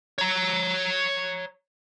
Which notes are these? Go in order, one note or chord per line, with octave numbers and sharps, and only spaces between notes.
C#5 A#5